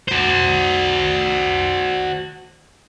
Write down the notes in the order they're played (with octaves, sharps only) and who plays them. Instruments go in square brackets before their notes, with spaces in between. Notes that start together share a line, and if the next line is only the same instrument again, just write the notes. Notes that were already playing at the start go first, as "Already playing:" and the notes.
[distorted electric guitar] F#4 C5